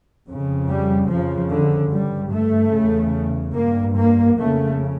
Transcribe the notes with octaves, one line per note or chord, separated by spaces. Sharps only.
F2 C#3
G3
F2 C#3 F3
D3
G2 G3
A3
C#3
E2
G2 A#3
A#3
F2 C#3 A3